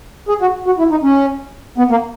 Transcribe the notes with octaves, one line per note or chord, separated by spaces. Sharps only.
G#4
F#4
F#4
E4
D#4
C#4
B3
A#3